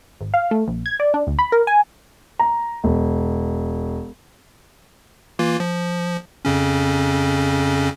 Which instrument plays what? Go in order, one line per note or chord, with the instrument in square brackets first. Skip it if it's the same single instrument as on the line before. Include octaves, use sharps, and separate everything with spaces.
[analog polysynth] G#1
F5
A3
A#1
G#6
D5
D4
D2
B5
A#4
G#5
[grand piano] A#5
E1
[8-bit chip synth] E3 A#3 F4
F3
F2 C#3 C#4